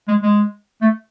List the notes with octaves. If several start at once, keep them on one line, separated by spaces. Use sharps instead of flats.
G#3
G#3
A3